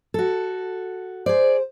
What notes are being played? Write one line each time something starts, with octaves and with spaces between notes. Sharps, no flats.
F#4 A4
G#4 C5 D5